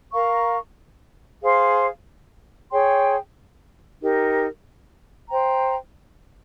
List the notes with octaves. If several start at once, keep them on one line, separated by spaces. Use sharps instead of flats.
A#4 F5 A#5 C#6
G#4 C5 F5 C6
G#4 C#5 G5 C6
D#4 G4 A#4
C5 G5 A#5